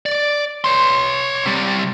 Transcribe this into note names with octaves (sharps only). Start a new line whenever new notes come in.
D5
C#5 C6
C3 G3